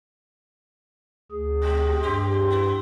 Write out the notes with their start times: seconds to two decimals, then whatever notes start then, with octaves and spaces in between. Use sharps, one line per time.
1.32 D2 G#4
1.62 B2 G#3 G4
2.03 G2 C4 G4 C6
2.50 B3 E4